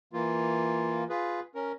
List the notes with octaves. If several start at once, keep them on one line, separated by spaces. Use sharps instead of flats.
E3 A#3 F4
F4 G#4 B4
C#4 A#4